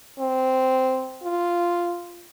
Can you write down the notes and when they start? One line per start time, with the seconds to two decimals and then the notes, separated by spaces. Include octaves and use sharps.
0.19 C4
1.23 F4